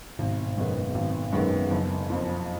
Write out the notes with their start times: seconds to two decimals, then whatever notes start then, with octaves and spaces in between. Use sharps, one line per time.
0.19 G#1 G#2 B2
0.57 F#2 D#3 G#3 B3
0.95 G#1 G#2 B2
1.33 F#2 D#3 G#3 B3
1.71 F#1
2.10 F2 F3